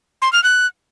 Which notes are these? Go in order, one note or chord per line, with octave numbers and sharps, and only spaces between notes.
C6
F6
F#6